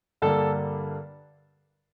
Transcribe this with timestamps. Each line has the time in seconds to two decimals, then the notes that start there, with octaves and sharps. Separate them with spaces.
0.22 G2 D3 G3 A#3 A4 A5